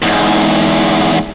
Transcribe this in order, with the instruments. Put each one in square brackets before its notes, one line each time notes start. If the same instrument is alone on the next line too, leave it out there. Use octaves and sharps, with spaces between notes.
[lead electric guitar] E2 G#2